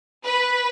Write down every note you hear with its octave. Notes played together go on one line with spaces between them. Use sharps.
B4